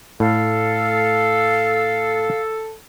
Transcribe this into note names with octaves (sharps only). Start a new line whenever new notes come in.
A2 A4 F5